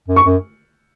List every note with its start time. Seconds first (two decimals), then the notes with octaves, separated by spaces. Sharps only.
0.08 F#2
0.16 C#6
0.25 F#2